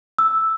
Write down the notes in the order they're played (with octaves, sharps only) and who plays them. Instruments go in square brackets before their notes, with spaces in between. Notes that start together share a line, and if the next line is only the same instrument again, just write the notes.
[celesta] E6